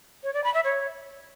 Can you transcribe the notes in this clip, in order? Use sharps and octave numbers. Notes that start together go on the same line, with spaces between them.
C#5
D5
B5
E5
C#5